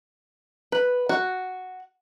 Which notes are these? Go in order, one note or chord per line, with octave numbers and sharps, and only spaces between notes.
B4
F#4